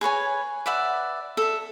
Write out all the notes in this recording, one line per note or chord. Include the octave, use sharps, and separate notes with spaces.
G#4 B4 C#5 G#5
B4 D5 E5 F#5
A4 E5